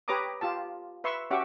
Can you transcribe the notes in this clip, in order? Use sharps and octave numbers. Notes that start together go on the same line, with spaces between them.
G4 B4 C#5 A#5 D6 D#6
F4 G4 A5
B4 E5 C6 C#6 E6
C#4 F#4 G4 E5 F#5 D6